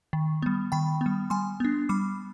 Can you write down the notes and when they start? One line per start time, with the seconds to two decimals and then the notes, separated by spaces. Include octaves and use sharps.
0.13 D#3
0.42 G3 B3
0.72 D#3 G5 B5
1.01 B3
1.06 G3
1.30 G3 G#5 C6
1.60 B3 D4
1.89 G3 B5 D6